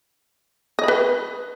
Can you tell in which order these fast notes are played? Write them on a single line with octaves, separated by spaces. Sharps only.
D#5 B5 B4